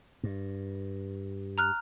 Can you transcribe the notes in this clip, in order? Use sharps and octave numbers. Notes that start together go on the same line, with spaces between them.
G2
A#5 F6 F#6